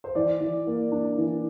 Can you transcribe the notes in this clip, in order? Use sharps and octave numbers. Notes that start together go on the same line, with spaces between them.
C5
E3 D5
E3
A#3
D4
E3